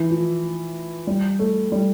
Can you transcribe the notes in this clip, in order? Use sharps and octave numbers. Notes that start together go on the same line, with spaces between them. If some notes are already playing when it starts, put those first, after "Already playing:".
Already playing: E3
F3
G3
A3
G3